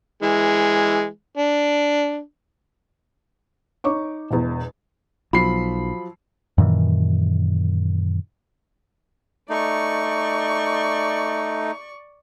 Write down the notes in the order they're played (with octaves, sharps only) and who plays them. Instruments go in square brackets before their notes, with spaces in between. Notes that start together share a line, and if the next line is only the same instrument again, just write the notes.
[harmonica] E3 G#3
D4
[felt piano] D#4 C#5 C#6 D6
E1 E2
[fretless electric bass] B1 [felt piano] F3 F#3 [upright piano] B5 C7
[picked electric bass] F#2 A#2 D#3 E3
[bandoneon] A3 D#4 [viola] D5 C#6